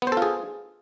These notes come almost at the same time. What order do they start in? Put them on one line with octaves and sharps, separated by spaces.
B3 C5 A4 F4 G#4